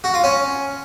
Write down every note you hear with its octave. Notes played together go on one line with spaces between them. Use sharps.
F#4
F4
C#4